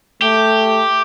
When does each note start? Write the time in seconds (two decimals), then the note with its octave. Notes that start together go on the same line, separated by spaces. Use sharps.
0.22 A3 G4